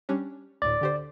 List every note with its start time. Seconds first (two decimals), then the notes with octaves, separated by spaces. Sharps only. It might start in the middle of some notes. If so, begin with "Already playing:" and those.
0.09 G3 C#4 D4
0.62 D2 A2 D5
0.81 D3 G4 C5